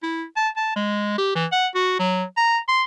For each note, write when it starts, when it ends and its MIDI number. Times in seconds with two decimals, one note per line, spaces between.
0.03 0.24 64
0.36 0.49 81
0.57 0.73 81
0.76 1.15 56
1.18 1.35 67
1.36 1.46 52
1.52 1.67 78
1.75 1.97 66
1.99 2.23 54
2.37 2.58 82
2.69 2.84 84